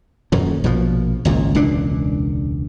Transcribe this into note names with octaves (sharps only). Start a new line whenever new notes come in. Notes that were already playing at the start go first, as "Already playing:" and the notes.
D#1 F#2 A#2
A#1 B2 F3
G#1 C#2 A#2
E1 C#2 A#2 D4